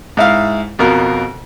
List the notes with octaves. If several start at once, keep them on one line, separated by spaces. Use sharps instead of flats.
G#2 E4 F5
F2 B2 A#4